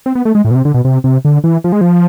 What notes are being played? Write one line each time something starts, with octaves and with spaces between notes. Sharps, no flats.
C4
B3
A3
G#3
A2
B2
C3
D3
B2
C3
C3
D3
E3
F3
G#3
F3